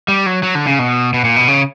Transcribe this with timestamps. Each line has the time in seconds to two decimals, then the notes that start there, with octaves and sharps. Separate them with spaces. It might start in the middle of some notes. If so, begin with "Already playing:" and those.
0.08 G3
0.26 F#3
0.43 F#3
0.55 D3
0.67 C#3
0.79 B2
1.14 B2
1.24 A#2
1.36 B2
1.48 C#3